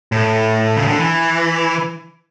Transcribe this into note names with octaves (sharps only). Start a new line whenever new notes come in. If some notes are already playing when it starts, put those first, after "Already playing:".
A2
C#3
D3
E3